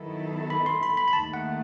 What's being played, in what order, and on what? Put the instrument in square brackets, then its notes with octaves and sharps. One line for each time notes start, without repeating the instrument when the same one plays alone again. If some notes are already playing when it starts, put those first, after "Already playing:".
Already playing: [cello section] D#3 F#3 B3 E4 A4
[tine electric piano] B5
C6
B5
B5
B5
[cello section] D#2 D#3 A3 [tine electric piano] A5
[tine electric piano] F#5